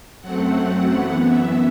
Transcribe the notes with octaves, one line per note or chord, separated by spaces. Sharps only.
F#2 F#3 A3 C4 F#5
F#2 E3 B3
E5